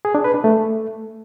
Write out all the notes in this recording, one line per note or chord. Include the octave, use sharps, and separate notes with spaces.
G#4
D4
B4
D4
A3